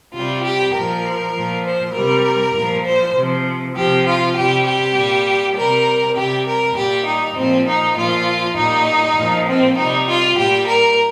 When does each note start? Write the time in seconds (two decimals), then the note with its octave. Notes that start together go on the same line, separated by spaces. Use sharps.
0.13 C3 G3 F4
0.43 G4
0.73 A#2 F3 A#4
1.34 A#2 F3
1.63 C5
1.94 C3 G3 A#4
2.54 A#2 F3
2.84 C5
3.14 C3 F3
3.74 C3 F3 G4
4.05 F4
4.35 C3 G3 G4
4.65 G4
4.95 A#2 G3
5.55 C3 G3 A#4
6.15 C3 G3 G4
6.45 A#4
6.76 A#2 G3 G4
7.06 D#4
7.36 A#2 F3 C4
7.66 D#4
7.96 A#2 F3 F4
8.56 A#2 G3 D#4
9.16 A#2 F3
9.47 C4
9.77 C3 G3 D#4
10.07 F4
10.37 A#2 G3 G4
10.67 A#4